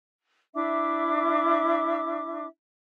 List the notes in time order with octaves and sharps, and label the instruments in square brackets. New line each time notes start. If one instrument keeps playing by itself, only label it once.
[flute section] D4 E4 E5 D6